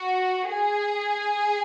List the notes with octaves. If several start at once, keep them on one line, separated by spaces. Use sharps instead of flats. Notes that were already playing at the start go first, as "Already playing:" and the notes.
Already playing: F#4
G#4